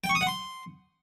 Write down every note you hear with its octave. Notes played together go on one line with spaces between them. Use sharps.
G5
C#6
D#6
F#5
C6